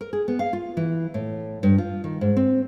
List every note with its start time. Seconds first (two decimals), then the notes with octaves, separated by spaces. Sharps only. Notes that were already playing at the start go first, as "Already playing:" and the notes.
0.01 A#4
0.13 G#4
0.28 B3
0.39 F5
0.53 F4
0.77 E3
1.14 A2
1.63 G2
1.78 F4
2.04 D#3
2.21 G#2
2.37 C4